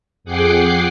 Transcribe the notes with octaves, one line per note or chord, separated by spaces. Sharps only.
F2 G#4 F#5 G5 D6 C7